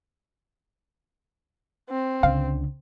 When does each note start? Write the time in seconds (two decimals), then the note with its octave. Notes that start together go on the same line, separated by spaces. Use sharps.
1.90 C4
2.23 C#2 D3 F5